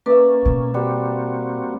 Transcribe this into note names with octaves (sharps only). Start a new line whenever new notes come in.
A#3 C#4 B4 D5 E5
B2
G3 A#3 C4 F#4